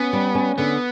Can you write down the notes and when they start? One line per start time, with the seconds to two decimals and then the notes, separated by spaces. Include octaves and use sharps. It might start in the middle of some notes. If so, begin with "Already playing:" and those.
Already playing: B3 C#4
0.13 G3
0.35 C#4
0.58 D3 B3